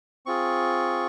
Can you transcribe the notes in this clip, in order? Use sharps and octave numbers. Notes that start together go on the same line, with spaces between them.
C4 F4 G#4 C#6